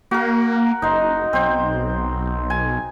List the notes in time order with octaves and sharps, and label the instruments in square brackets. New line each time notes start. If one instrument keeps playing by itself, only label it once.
[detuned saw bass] A#3 [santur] F#4 A#4
[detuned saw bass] F#1 [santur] D#4 C6
[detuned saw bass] B1 [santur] C4 C5
[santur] G#5